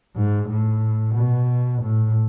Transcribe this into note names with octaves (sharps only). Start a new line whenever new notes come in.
G#2
A2
B2
A2